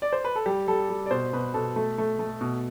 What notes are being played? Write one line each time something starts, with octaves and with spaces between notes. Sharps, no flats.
D5
C5
B4
A4
G3 G4
G3 A4
G3
D5
B2 C5
B2 B4
B2 A4
A3
A3
A3
B2